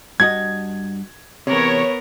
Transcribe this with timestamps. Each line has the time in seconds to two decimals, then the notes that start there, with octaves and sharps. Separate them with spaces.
0.20 G2 F#4 D#5 G#6
1.47 E2 C3 B3 A#4 C#5